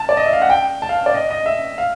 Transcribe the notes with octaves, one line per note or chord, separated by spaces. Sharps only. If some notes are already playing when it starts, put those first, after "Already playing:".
Already playing: A5
D5
D#5
E5
F5
F#5
G5
A5
F5
D5
D#5
D#5
E5
F5